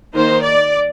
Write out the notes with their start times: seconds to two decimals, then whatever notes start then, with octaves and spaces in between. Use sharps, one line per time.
0.13 D#3 A#3 D#4 C5
0.43 D5